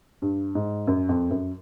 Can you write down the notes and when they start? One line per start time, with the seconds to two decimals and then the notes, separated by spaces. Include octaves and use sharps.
0.22 G2
0.55 G#2
0.87 F#2
1.09 F2
1.31 F#2